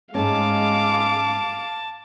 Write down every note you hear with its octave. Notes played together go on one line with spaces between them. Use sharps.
G#2 G#3 A3 C#4 F5 A5 D6